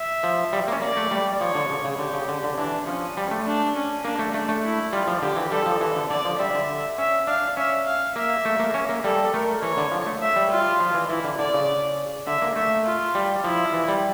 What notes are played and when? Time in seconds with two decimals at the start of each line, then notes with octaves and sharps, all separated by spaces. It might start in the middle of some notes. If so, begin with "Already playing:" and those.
Already playing: E5
0.23 F3
0.53 G3
0.68 A#3
0.72 C#4
0.82 A#3 D5
0.97 A3
1.11 G3
1.41 F3 C#5
1.55 D3
1.70 C#3
1.84 C#3
1.99 D3 G4
2.13 C#3
2.28 D3
2.44 D3
2.58 E3 D4
2.87 F3 C#4
3.17 G3
3.31 A3
3.46 D4
3.76 C#4
4.04 A#3 D4
4.19 A3
4.34 A3 D4
4.49 A3
4.64 E4
4.93 G3 F4
5.07 F3
5.22 D3 G4
5.36 E3
5.51 G3 A4
5.66 F3
5.81 E3 A4
5.96 D3
6.10 D3 D5
6.25 F3
6.39 G3 E5
6.55 D3
6.98 C#4 E5
7.27 D4 F5
7.57 C#4 E5
7.86 F5
8.16 A#3 E5
8.45 A3
8.59 A#3
8.74 C#4
8.89 A#3
9.04 G3 A4
9.33 A3 A#4
9.62 E3 C#5
9.77 D3
9.92 F3
10.06 A3
10.22 E5
10.36 G3
10.50 F4
10.80 F3
10.94 E3
11.09 E3 E4
11.24 D3
11.38 D3 D5
11.54 C#3
12.27 D3 E5
12.42 A#3
12.56 A3 E5
12.85 F4
13.15 G3
13.44 F3 E4
13.73 E3
13.88 G3